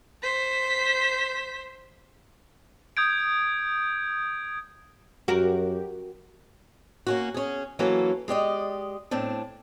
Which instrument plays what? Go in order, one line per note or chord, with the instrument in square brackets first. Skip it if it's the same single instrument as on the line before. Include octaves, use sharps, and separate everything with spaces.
[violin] C5 B6
[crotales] D#6 G6 G#6 D7
[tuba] F#2 [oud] F#4 A#4 [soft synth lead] G4
[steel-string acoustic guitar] A#3 C#4 F#4
C#4 G#4
E3 F#3 A#3 C#4 F#4 A4
G#3 G4 D5 D#5
A2 C4 D4